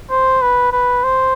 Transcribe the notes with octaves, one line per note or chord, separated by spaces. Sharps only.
C5
B4
B4
C5